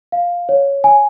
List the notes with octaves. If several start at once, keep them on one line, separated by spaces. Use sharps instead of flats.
F5
C#5
G#5